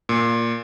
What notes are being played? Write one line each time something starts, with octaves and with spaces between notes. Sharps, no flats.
A#2